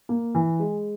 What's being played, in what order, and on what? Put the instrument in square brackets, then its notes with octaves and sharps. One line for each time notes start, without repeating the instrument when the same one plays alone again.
[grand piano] A#3
E3
G#3